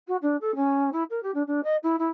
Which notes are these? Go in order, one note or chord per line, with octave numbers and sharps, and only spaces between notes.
F#4
D4
A4
C#4
E4
A#4
G4
D4
D4
D#5
E4
E4